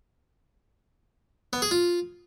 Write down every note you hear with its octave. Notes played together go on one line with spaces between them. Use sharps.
B3
G#4
F4